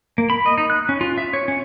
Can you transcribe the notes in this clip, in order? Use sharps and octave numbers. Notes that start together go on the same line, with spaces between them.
A#3
B5
D#5
D#4
F#6
C#4
F4
E5
C#5
C#4